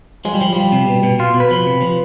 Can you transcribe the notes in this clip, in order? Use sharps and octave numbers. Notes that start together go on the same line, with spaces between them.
F3 G#3
G3
F3
F3 G3
C3
B2
B2
B2 F4
B2
B4
F3
C3
F3